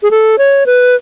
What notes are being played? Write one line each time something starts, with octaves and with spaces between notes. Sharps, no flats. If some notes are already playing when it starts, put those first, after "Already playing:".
G#4
A4
C#5
B4